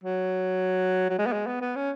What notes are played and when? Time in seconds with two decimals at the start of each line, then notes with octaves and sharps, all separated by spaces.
0.03 F#3
1.10 F#3
1.18 G#3
1.26 B3
1.32 G#3
1.47 B3
1.61 B3
1.76 C#4